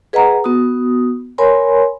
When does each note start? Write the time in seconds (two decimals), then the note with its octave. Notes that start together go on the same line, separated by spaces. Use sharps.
0.13 G#4 B4 D#5 F#5 G#5 A#5
0.44 B3 F#4 D#6
1.38 A#4 C#5 G#5 B5 C6